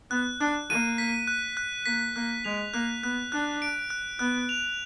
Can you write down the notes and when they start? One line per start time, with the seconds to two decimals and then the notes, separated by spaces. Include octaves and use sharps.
0.10 B3 F#6
0.41 D4 F#6
0.69 A#3 D#7
0.98 B6
1.27 F#6
1.57 F#6
1.86 A#3 B6
2.16 A#3 F#6
2.44 G#3 F7
2.74 A#3 F#6
3.03 B3 F#6
3.32 D4 F#6
3.62 D7
3.90 F#6
4.19 B3 F#6
4.49 F7